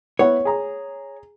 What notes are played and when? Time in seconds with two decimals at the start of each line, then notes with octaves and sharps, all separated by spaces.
0.19 B3 E4 C#5 F#5
0.45 G#4 A#5